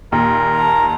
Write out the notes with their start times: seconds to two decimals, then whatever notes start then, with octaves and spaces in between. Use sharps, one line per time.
0.12 D#2 A#2 A#4
0.56 A5 A#5